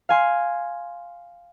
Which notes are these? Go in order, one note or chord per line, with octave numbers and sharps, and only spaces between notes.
F5 G#5 C6